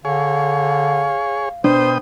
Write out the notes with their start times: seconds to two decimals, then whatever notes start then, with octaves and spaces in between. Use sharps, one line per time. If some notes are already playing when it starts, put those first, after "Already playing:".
0.05 D3 G#4 C#5 F5
1.64 B2 D4 C5 G5 D#6